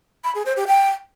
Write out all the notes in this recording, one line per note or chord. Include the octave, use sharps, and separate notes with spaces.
B5
G#4
C5
G4
G5